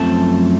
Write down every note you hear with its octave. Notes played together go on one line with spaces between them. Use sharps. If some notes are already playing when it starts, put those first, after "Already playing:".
Already playing: F#2 F3 A3 C4 A5